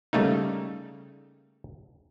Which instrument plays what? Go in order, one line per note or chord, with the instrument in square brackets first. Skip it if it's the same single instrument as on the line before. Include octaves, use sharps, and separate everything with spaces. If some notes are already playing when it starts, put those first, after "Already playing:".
[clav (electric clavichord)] C#3 G3 A3 A#3 D#4